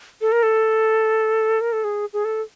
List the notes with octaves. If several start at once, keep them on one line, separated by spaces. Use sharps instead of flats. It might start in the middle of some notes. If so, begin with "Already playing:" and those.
A4
A#4
A4
A#4
A4
G#4
G#4
A4